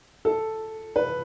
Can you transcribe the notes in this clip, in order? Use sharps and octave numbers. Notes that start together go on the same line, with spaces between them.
A4
B4